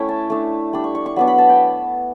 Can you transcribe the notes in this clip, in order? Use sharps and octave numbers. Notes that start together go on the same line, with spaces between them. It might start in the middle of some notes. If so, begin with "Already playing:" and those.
Already playing: A3 C#4 E4 C#5 E5 G5
A5
A3 D4
G3 D4 B5
C#6
C#6
C#6
F#3 B3 D4 B5
B5
A5
G5